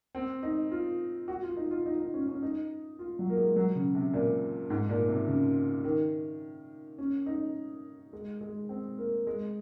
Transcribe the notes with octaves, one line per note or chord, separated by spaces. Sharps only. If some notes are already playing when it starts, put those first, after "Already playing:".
C4
D#4
F4
F#4
F4
D#4
F4
D#4
D#4
C#4
C#4
D#4
F4
F#3
A#3
G#3
F#3
C#3
C3
A#2
G#2
A#2
C3
C#3
D#3
C#4
D#4
G#3
G#3
C4
A#3
G#3